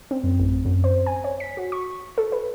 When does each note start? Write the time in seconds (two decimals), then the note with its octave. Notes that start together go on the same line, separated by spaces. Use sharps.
0.11 C4
0.24 F#2
0.40 A1
0.65 F#2
0.84 C5
1.06 G#5
1.24 C#5
1.40 B6
1.57 F#4
1.72 C#6
2.18 A4
2.32 B4